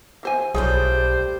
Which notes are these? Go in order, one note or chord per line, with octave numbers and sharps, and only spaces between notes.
E3 C5 G#5
B1 A2 F3 G3 G4 G#4 C5 C#5